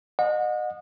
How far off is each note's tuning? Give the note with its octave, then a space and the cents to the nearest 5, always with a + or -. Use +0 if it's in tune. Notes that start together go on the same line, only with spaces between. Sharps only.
D#5 -30 F#5 -35